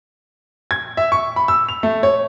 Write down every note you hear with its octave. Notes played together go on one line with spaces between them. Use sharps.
G#6
E5
C#6
B5
E6
F7
A3
C#5